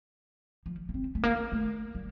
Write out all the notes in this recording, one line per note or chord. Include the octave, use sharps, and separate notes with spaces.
F3
A#3
C4
A3
A#3
A3
G3